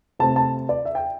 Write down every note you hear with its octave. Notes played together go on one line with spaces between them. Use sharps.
C3 A3 C4 A5
A5
D5
E5
G5